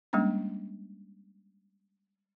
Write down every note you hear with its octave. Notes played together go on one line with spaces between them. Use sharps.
G3 G#3 A#3 C#4 D4